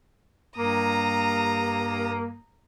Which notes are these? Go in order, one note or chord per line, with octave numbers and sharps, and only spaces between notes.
G2 A#3 A#5 D#6